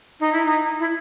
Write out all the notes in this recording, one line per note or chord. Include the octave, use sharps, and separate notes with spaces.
D#4
E4
D#4
E4